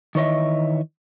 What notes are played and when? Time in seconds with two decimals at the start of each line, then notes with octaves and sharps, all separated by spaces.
0.15 D#3 E3 C#5 D#5 E5